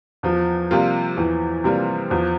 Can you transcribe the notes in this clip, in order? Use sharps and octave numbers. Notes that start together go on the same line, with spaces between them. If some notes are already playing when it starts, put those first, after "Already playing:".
E2 F3
C3 G3 A#3 F4
E2 E3
C3 G3 A#3 F4
E2 F3